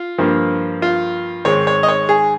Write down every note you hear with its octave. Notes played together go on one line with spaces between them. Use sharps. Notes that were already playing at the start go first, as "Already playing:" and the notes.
Already playing: F4
G2 F3 A#3
F4
G#2 D#3 G#3 C4 C#5
C#5
D#5
C#5
G#4